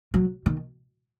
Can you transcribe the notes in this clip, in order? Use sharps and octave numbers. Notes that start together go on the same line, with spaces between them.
F#3
D#3